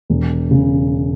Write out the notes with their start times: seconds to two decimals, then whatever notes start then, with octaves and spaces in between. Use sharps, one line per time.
0.10 E1
0.51 C#3